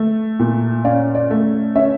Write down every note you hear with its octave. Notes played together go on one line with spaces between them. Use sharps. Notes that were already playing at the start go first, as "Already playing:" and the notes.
Already playing: A3
A#2
C#4 D5 F5
D5
A3
C#4 C#5 E5